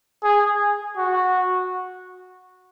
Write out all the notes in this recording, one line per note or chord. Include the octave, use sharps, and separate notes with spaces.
G#4
F#4